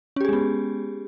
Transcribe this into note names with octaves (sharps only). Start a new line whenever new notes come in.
G#3 B3 C#4 G4 G#4